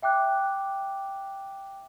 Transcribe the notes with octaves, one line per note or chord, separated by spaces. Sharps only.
E5 G5 D6 F#6